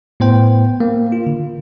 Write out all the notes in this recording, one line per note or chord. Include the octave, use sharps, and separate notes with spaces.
A2 B3 C5 G5
A#3
F4
D3